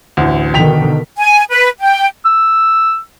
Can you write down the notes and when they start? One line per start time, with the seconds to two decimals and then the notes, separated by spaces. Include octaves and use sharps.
0.17 A1 D2
0.54 B2 D3 D#3 G5 B6 F7
1.17 G#5
1.50 B4
1.80 G5
2.25 E6